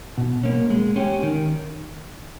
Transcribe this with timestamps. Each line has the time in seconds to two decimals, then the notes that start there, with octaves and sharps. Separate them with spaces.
0.18 B2
0.43 A#3 C#4
0.70 G#3
0.96 C#4 G4
1.23 D#3